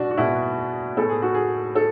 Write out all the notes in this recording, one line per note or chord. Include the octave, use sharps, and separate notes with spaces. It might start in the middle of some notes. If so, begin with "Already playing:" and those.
Already playing: B2 D4 F#4
F#4
B2 G#3 B3 E4
A2 G#3 B3 A4
G#4
F#4
G#4
A4